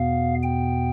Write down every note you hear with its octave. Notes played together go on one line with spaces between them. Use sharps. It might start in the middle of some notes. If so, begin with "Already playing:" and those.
Already playing: E2 B2 B3 F5
G5